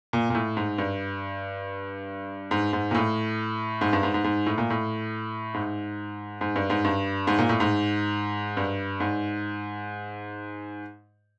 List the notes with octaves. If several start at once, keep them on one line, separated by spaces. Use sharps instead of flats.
A#2
A#2
A2
G#2
G2
G#2
G#2
A#2
A2
G#2
G2
G#2
G#2
G#2
A2
A#2
A2
G#2
G#2
G2
G#2
G2
G#2
A#2
A2
G#2
G2
G#2